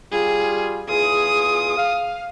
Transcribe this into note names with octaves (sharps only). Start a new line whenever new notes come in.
G3 F4 G#4
E2 F4 G#4 D#6
F5